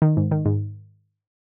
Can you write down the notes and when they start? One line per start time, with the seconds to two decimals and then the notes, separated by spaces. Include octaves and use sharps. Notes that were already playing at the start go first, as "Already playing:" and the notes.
0.02 D#3
0.17 G#2
0.31 D#3
0.45 G#2